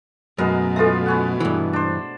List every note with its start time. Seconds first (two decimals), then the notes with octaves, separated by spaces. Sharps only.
0.38 F#2 B2 G#3 A3 B3 A#4
0.76 G#3 B3 F4 A4 E5
1.06 B3 C#4 F#5
1.40 G2 E3
1.73 D4 C5